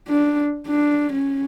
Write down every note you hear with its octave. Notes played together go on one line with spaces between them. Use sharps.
D4
D4
C#4